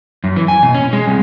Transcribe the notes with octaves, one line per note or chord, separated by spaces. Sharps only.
F#2
E3
G#5
B2
C#4
G#3
C2